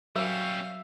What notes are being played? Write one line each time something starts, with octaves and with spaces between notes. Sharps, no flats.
F#3 G3 C#4 A#4 E5 F5